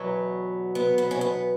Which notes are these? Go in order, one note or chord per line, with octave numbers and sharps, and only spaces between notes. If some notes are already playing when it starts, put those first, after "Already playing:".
Already playing: E2 B2 F#3 B3
B3
B3
C#4
B3